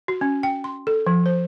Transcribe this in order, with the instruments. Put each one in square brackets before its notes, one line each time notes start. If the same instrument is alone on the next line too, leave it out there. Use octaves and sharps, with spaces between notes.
[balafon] F#4
C#4
G5
C6
A4
F3
C5